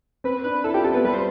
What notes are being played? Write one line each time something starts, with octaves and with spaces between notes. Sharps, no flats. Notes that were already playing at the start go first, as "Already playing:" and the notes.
C4 B4
D4 B4
E4 A4
F4 G4
C4 A4
B3 B4
G3 B4
C5